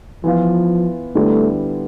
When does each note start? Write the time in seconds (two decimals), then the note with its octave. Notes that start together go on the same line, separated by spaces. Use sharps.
0.24 E3 F3 B3 F4
1.15 D3 G3 A3 B3 E4